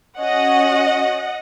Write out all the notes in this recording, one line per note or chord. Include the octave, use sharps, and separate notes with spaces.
C#4 F#4 D#5 F#5